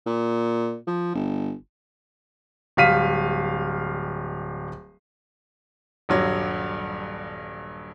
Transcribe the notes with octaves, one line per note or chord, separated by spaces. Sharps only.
A#2
F3
G1
D1 G3 F5 B6 D#7
D#1 G2 F#3